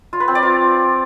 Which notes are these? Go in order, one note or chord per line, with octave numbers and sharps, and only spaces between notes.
F4
B4
C4
D5
F4